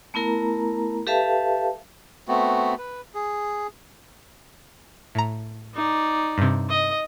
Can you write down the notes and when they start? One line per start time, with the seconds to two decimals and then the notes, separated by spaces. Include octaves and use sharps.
0.14 A3 B3 E4 A#4 A#5
1.07 G4 A4 B4 E5 F5 A5
2.28 A3 B3 C4 F#4
2.79 B4
3.14 G#4
5.15 A2 A#5
5.75 D#4 D5
6.38 G2 C3
6.69 D#5